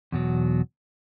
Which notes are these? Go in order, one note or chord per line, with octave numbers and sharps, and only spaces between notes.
E2 B2 F#3